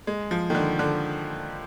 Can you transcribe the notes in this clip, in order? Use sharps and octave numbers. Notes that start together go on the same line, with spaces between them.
G#3
F3
D#3
D3
D3